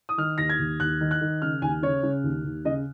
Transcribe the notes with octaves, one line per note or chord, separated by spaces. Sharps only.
D#6
D#3 F6
D#2 A#6
G#6
D#2
D#2 F#6
D#3
F#6
D#3
C#3 F6
D#2 G#5
C#3 C#5
C#3
D#2
D#2
C#3 D#5